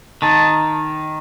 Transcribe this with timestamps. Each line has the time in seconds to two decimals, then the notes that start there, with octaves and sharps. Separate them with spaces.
0.22 D#3 A5